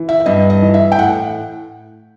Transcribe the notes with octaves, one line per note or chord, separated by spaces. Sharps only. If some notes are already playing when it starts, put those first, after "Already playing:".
Already playing: E3
E5
E5
G2 D#5
D#5
E3
E5
G5
A2 F#5